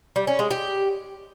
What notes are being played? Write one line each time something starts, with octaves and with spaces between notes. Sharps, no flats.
G3
C#4
G#3
G4